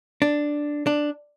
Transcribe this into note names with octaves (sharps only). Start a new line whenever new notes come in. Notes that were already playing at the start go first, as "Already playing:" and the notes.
D4
D4